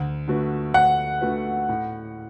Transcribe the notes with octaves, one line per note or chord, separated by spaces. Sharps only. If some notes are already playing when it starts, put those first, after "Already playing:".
Already playing: D2
D3 A3 F#4 B4
D2 F#5
D3 A3 F#4 B4
A2